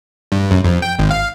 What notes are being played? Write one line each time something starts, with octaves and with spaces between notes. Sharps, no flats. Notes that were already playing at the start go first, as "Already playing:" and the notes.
G2
F#2
F2
G5
G#1
F5